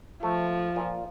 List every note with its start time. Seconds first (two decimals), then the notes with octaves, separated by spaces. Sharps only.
0.23 F3 A3
0.76 A#2